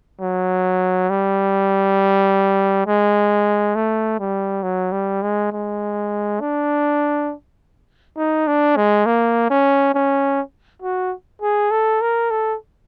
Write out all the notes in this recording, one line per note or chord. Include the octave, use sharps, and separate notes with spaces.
F#3
G3
G#3
A3
G3
F#3
G3
G#3
G#3
D4
D#4
D4
G#3
A#3
C#4
C#4
F#4
G#4
A4
A#4
A4